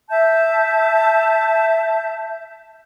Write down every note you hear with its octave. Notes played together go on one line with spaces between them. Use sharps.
E5 A5 G6